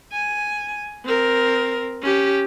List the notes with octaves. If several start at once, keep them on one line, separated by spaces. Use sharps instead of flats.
G#5
C4 A#4
C#4 G4